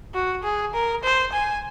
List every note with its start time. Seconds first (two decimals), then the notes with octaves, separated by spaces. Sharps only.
0.14 F#4
0.44 G#4
0.74 A#4
1.04 C5
1.33 G#5